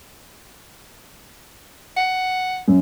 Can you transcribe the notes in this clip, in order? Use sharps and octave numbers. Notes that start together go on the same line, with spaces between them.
F#5
F#2